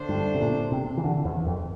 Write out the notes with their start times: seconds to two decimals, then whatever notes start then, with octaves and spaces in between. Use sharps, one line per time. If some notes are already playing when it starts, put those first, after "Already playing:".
Already playing: D3 A3 D4 A4 C5
0.09 G2
0.34 C3
0.40 A#2
0.72 C3
0.97 E3
1.04 D3
1.25 E2
1.46 F2